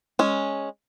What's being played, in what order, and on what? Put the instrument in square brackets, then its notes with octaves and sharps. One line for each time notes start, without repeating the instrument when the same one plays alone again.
[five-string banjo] G#3 C#4